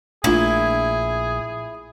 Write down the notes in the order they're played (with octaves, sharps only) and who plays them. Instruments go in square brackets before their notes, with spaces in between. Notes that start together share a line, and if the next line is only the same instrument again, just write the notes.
[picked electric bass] A#1 A#2 [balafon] A3 D4 F4 [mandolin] E4 [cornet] G#4